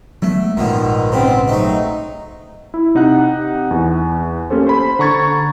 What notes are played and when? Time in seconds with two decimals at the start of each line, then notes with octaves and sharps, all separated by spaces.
0.22 F#3 G#3 A3 B3
0.57 A#1 G#2 B2 D3 D#3 F3
1.12 C#3 B3 C4
1.48 F#3 A3 D#4
2.74 E4
2.95 C3 D#4 F#5 F#6
3.71 E2
4.50 A#3 C#4 G4 A4 C5
4.67 C5 B5
4.99 D3 A#5 C#6 G#6 A6